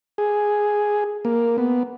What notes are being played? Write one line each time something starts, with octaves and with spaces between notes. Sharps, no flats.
G#4
A#3
B3